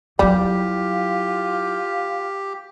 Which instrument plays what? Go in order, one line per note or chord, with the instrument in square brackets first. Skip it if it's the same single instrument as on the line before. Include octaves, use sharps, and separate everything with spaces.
[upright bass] F#3 E4 [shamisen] G3 [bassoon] F4 [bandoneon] G4